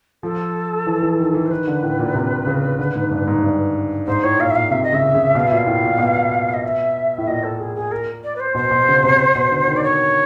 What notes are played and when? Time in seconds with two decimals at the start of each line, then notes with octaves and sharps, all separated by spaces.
0.23 F3 A4
0.87 E3
1.02 E3
1.19 D#3
1.34 E3
1.46 C5
1.50 D#3 B4
1.67 D3
1.83 A2
1.99 A#2
2.15 C3
2.47 C#3
2.79 D3
2.95 G#2
3.11 G2
3.27 G#2
3.43 G2
4.06 G#2 C5
4.23 A2 C#5
4.39 A#2 F5
4.50 E5
4.55 A#2 F5
4.71 C3 E5
4.83 D#5
4.92 C#3 E5
5.14 C#3
5.35 B2 F5
5.47 A#2 E5
5.57 F5
5.67 A2
5.84 A#2
5.99 B2
6.53 D#5
6.63 E5
7.18 A2
7.27 A#2 D#5
7.43 A4
7.59 G#4
7.75 G#4
7.91 A#4
8.23 D5
8.35 B4
8.39 C5
8.55 B2 C5
8.71 B2
8.88 C#3
9.04 C3
9.35 B2
9.51 D3
9.68 D#3
9.76 D5
9.83 C#5